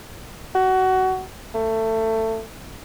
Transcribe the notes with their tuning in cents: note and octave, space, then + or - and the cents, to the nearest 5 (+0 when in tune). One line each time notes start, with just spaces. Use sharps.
F#4 +20
A3 +20